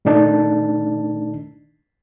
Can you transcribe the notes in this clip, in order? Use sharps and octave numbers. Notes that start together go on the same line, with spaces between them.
A#2 D#3 A3 D4 D#4 A5